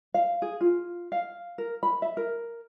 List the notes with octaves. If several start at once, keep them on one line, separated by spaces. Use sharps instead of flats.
F5
G#4
F4
F5
A#4
B5
E5
A#4